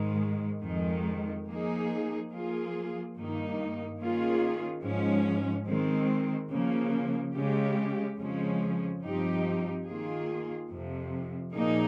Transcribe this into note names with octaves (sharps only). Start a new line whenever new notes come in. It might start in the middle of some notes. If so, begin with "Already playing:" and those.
Already playing: G#2 D#3 G#3
F2 D#3 G#3
F3 A#3 D#4 G#4
F3 A#3 F4 G#4
G2 D#3 A#3 D#4
D#3 A#3 C#4 F4 G#4
G#2 F3 G#3 C#4
D#3 G#3 C4
C#3 F3 A#3
C#3 G#3 C#4 G4
F2 C#3 F3 G#3 C#4
G2 F3 C4 D#4 G4
D#3 A#3 F4 G#4
F2 C3 F3
A#2 F3 A#3 D#4 G#4